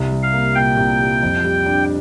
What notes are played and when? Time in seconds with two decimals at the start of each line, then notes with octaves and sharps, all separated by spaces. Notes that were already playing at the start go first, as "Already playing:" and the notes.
Already playing: C2
0.11 G3
0.23 F5
0.33 A#3
0.55 A#2 G5
0.77 C2
1.01 G3
1.22 F2
1.44 G3
1.66 D4